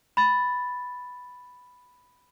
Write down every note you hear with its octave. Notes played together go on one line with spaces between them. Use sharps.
B5 A6